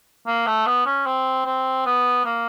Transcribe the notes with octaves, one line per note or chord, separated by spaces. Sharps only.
A#3
A3
B3
C#4
C4
C4
B3
A#3